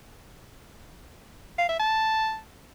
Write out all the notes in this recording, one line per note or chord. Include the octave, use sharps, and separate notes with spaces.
F5
E5
A5